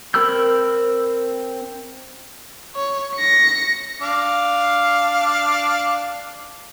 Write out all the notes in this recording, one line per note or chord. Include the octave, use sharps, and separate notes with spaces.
C4 A#4 B5 E6 G6
C#5
A#6 C#7
D4 F5 D6